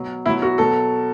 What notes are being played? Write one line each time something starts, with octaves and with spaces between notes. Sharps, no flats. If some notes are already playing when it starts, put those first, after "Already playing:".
Already playing: B2 F#3
B2 F#3 E4
F#4
B2 F#3 A4